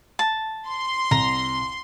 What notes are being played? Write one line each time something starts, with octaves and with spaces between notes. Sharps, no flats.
A5
C6
C2 A#5